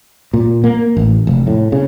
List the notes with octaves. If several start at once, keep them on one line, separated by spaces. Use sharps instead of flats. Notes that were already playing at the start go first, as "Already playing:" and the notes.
A#2
A#3
A1
F1
A2
C#3